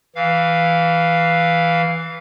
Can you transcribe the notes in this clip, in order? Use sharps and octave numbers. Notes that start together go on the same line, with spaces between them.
E3 F5